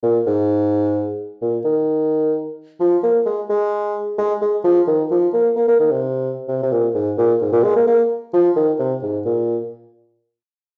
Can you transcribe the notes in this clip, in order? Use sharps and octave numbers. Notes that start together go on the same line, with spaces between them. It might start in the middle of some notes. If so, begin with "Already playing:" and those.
A#2
G#2
A#2
D#3
F3
A#3
G#3
G#3
G#3
G#3
F3
D#3
F3
A#3
A#3
A#3
D#3
C3
C3
C3
A#2
G#2
A#2
G#2
A#2
G#3
A#3
A#3
F3
D#3
C3
G#2
A#2